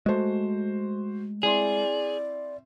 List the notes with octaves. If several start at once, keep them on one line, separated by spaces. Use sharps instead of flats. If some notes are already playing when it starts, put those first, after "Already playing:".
G#3 A3 F#4 C5
C4 E4 G#4 D5 C6